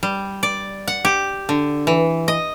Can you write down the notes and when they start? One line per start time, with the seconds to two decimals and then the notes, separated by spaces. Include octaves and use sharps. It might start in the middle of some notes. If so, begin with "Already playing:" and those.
0.03 G3
0.43 D5
0.87 F#5
1.05 G4
1.49 D3
1.87 E3
2.28 D#5